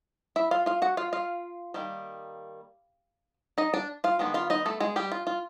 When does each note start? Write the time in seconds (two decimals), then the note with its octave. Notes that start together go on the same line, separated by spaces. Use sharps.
0.36 E4 E5
0.51 F4 F5
0.66 F4 F5
0.82 F#4 F#5
0.97 F4 F5
1.13 F4 F5
1.74 D#3 G3 A#3
3.58 D#4 D#5
3.74 D4 D5
4.04 F4 F5
4.19 D#3 G#3 B3 D4
4.34 F4 F5
4.50 D#4 D#5
4.66 A3 A4
4.80 G#3 G#4
4.96 G3 G4
5.12 F4
5.27 F4